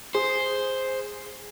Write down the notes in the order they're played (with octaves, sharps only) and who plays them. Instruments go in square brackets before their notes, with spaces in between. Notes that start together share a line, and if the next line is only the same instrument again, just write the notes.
[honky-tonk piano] G#4 [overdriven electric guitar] C5